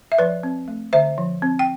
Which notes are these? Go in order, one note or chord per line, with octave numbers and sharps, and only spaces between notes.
E5
F3 B4 D5
C4
A3
D3 C5 E5
F3
C4
G5